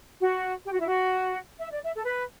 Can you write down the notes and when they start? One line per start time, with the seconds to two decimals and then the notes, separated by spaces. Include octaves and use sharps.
0.19 F#4
0.66 G4
0.73 F#4
0.81 E4
0.88 F#4
1.59 E5
1.72 D5
1.84 E5
1.95 A4
2.06 B4